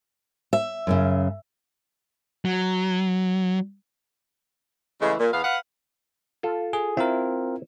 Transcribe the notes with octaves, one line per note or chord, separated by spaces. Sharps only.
E5
F#2 A2 C#3
F#3
C#3 E3 G#3 A3
A#2
E2 B3 F5
B4 F5 F#5
F4 A4
G#4
C4 E4 F4 A#4